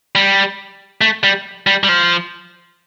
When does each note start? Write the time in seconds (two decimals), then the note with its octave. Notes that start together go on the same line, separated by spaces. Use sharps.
0.15 G3
1.01 A3
1.24 G3
1.67 G3
1.84 G3
1.89 F3